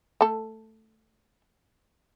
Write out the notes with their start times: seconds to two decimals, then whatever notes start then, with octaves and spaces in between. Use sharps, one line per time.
0.21 A3 A4